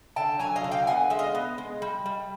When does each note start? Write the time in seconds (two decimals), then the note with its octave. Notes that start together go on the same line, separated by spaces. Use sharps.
0.16 D3 G5 A5
0.39 F#3 G#5 A#5
0.56 D#5 F5
0.64 D3
0.71 F5 G5
0.87 B3 F#5 G#5
1.10 G#3 E5
1.19 D#5 F5
1.35 B3
1.58 G#3
1.82 G3
2.06 G3